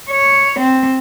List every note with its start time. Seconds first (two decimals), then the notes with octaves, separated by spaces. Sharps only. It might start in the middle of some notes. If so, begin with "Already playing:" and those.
0.10 C#5
0.59 C4